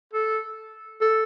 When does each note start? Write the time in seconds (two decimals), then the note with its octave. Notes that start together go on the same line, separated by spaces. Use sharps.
0.13 A4
1.01 A4